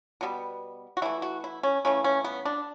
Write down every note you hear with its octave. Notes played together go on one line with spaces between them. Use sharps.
B2 G3 B3
F#4
E3 A3 E4
F#4
E4
C#4
C#3 E3 A3 C#4
C#4
B3
D4